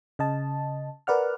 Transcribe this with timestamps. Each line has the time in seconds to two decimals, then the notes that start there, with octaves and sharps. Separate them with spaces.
0.19 C#3 D#5 A5
1.07 A#4 B4 D5 F#5 F6